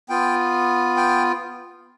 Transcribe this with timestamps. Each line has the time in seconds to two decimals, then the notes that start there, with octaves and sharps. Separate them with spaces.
0.09 B3 F4 G5
0.97 G5